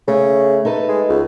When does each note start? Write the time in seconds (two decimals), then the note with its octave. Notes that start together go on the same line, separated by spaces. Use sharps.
0.08 C#3 A3
0.65 D#4 A4 B4
0.89 G#3
1.09 C#2